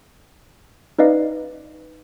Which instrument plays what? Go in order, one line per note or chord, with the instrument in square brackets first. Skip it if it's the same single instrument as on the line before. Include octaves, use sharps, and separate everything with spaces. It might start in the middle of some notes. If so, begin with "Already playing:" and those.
[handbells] D#4 B4 D5 D#5 F5